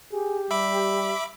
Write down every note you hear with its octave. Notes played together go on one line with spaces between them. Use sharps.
G4 G#4
G3 E5 B5 D6